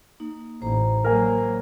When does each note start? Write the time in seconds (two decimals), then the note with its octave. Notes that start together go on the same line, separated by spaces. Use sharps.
0.20 A#3 D#4
0.62 A1 C5 A#5
1.04 F#3 A#3 A#4 G#5